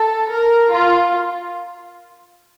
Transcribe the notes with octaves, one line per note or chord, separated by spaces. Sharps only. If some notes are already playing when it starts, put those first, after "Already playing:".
Already playing: A4
A#4
F4